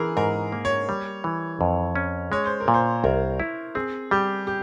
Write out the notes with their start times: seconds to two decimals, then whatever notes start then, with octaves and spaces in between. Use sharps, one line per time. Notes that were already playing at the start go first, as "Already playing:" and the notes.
Already playing: E3 G#4 A#4
0.17 G#2 A#4
0.52 A#3
0.65 C#5
0.89 G3
1.24 E3
1.61 F2
1.96 C#4
2.32 G#3 C#5
2.46 C5
2.60 A#4
2.68 A#2
2.74 C5
3.04 C2 A#4
3.40 E4
3.75 C4 G#4
4.11 G3 G4
4.47 G4